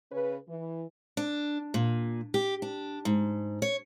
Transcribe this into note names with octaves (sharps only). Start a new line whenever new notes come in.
C#3 C#4 B4
E3
D4
A#2
G4
D4
G#2
C#5